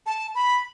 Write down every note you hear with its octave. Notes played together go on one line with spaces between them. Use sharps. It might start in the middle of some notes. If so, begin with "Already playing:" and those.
A5
B5